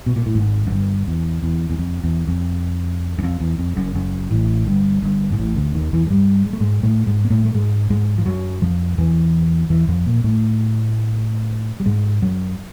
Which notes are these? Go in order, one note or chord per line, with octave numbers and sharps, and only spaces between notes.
B2
A#2
A2
G#1 G#2
F#2
G1 G2
E2
E2
E2
F2
E2
F2
F#2
F2
E2
F2
F#1 F#2
F#1 F#2
A1 A2
G1 G2
G1 G2
G#2
A1 A2
D2 D3
D#2 D#3
E2 E3
G#3
G2 G3
G#3
A3
G#2 G#3
A2 A3
G#2 G#3
A#3
A2 A3
A3
G#2 G#3
G#2 G#3
F3
F#2 F#3
F2 F3
E2 E3
E2 E3
F2 F3
A#2 A#3
A2 A3
G3
G#2 G#3
F#2 F#3